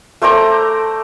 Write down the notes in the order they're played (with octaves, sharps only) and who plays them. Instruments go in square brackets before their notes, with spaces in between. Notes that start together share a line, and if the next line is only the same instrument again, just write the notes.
[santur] A3 C5 D5 A#5